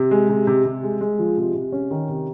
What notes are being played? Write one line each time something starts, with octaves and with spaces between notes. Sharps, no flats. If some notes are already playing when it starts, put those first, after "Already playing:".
Already playing: C3
G#3
C3
C3
C3
G#3
G#3
F3
C3
C3
C#4
D#3
C3